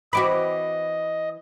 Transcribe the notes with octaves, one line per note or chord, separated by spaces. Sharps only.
E3 C4 F#4 D#5 B5 D6